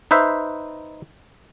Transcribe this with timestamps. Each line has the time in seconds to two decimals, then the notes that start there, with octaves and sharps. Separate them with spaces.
0.11 D#4 B4 C5 E5